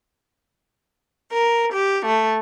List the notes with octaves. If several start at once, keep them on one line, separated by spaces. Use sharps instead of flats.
A#4
G4
A3